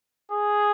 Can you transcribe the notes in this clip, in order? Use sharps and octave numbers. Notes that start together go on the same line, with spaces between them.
G#4